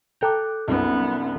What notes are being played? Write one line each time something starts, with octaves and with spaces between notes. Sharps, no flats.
A4 G5 A#5 D6 F#6 G6
C2 F#2 B3 D#4 F4 A#4